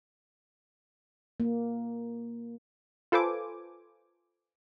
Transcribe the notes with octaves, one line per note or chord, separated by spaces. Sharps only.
A#3
F4 A4 B4 C5 G#5 D6